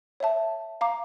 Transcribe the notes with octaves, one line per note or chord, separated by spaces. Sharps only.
C#5 E5 A5
F5 A#5 D6